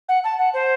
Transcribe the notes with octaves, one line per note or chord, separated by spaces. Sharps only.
F#5
A5
F#5
C5